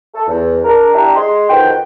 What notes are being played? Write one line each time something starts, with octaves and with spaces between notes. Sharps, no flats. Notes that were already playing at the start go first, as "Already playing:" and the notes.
A4
E2
D4 A#4
D4 E4 G4 E5 A#5
G#3 C6
F2 D#3 F#4 B4 G5